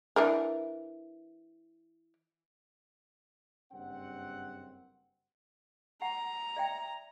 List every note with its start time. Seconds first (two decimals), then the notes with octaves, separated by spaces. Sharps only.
0.16 E3 D4 A#4
3.72 F#1 G2 C4 F#5
6.02 F#5 A#5
6.57 D5 E5 G5